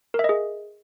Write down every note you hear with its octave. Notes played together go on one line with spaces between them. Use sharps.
A#4
E5
D#5
G#4